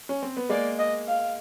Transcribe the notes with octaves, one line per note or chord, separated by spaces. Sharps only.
C#4
C4
B3
G#3 A#3 D5
D#5
F5